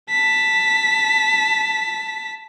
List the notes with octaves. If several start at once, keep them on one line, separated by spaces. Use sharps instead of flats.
A5 B6